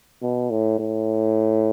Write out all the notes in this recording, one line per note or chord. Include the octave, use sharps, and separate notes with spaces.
B2
A2
A2